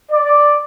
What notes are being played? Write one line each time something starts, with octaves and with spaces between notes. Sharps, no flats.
D5